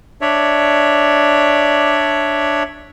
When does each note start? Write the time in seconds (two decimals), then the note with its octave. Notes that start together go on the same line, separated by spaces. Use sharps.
0.21 D4 C#5 D5 E5